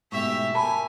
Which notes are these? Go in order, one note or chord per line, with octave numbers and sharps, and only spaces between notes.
G#2 B2 A3 G4 E5 C#6
A#4 G#5 A5 B5